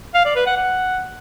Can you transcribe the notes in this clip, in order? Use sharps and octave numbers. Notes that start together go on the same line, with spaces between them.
F5
D5
B4
F#5
F#5